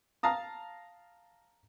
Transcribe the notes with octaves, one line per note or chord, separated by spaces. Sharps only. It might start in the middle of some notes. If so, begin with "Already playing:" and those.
F5 A5 A#5 D#6